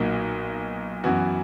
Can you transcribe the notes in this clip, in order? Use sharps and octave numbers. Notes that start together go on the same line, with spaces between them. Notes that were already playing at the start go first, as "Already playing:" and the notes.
Already playing: B1 A#2 A#3 D#4 F#4
F#2 E3 B3 F#4